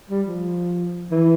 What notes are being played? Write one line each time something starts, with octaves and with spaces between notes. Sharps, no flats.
G3
F3
E3